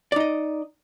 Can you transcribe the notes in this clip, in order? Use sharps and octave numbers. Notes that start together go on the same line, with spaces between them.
D#4 D5 D#5